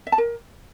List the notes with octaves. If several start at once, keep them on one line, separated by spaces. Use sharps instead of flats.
E5
A5
A#4